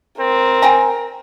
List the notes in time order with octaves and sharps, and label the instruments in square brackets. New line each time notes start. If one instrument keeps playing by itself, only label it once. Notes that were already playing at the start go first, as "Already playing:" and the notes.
[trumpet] C4 [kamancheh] A#4
[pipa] G5 G#5 A#5